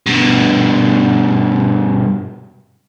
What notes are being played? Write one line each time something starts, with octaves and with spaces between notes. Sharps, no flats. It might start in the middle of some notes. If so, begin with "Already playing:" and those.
G2 B2